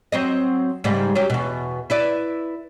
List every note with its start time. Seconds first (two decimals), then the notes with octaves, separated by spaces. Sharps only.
0.12 F#3 C4 D#5
0.84 G#2 C#3 G3
1.15 F#3 C#4 G4
1.30 E2 B2
1.90 E4 B4 D5